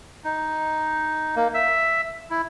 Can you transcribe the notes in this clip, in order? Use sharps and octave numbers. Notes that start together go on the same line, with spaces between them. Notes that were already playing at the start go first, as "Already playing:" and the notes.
D#4
A#3
E5
E4